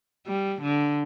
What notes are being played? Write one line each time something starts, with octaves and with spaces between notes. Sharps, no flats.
G3
D3